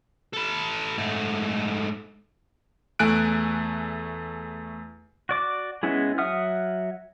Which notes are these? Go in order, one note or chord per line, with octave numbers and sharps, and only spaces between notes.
A4 B4
G#2 A3
E2 A3 G#5 F#6 D7
F#4 D5 D6
G#3 B3 C#4 E4 G#4
F#3 E5 F#5 D#6 F6